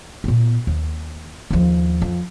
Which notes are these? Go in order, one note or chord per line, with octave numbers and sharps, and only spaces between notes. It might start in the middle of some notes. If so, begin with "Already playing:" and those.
A#2 B3
D#2
D#2 F3
F2